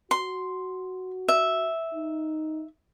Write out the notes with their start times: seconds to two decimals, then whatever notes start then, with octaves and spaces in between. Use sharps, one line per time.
0.11 F#4 C6
1.28 E5
1.94 D#4